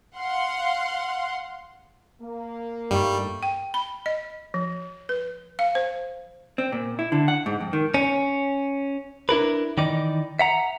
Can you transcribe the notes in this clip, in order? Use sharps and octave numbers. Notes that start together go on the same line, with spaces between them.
F5 F#5 C6
A#3
G2 G3 A3 D#4 F4
G5
B5
D#5
F3
B4
F5
C5
C4
A#2
E4
D3
F#5
G#2
F2
D#3
C#4
D4 E4 A#4 B4
D#3 E3 D#4 D5
E5 F#5 A#5